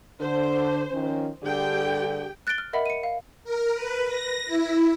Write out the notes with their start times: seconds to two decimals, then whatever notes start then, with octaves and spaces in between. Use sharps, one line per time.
0.21 D3 C5
0.91 D#3 F3 C#4
1.43 G2 D3 G4 G#4 G5
2.47 F#6 A6 A#6 D7 G7
2.58 F6
2.73 A#4 D#5 E5 F#5 B5
2.86 C#7 D#7
3.03 F5
3.44 A#4
3.75 B4
4.07 A#6
4.46 E4